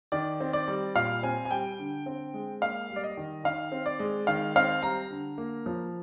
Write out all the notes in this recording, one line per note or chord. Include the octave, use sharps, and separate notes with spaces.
D#3 D5
C4
D5
G3
A#2 F5
C4 G#5
G#5
G3 G5
D3
C4
G#3
A#3 F5
G3
D5
D#5
D#3
D#3 F5
C4
D5
G#3
D#3 F5
C4 F5
G3 A#5
D3
A#3
F3